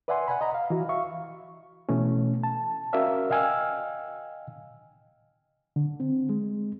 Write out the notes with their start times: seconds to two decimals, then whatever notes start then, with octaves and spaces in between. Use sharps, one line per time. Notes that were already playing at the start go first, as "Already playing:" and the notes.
0.08 B4 D5 E5 F#5 G#5 C6
0.28 F#5 G#5 B5
0.41 D#5 A#5 B5
0.55 F5
0.70 E3 F#4
0.89 E5 F5 C#6
1.89 B2 E3 A3 C#4
2.43 A5
2.93 C#4 F#4 A#4 D5 E5 F5
3.30 D#5 F5 G5 G#5 E6 F6
5.76 D3
6.00 C4
6.29 G#3